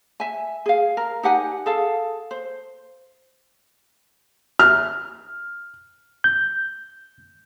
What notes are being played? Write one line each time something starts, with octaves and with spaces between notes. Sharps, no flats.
E5 G#5
G#4 F5
A#4
D#4 G4 F#5 G#5
G#4 A4 F5
C5
F6
G6